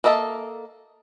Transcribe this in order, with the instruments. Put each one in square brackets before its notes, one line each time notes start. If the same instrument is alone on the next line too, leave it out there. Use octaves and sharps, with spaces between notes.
[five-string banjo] A#3 A4 D#5 E5 A5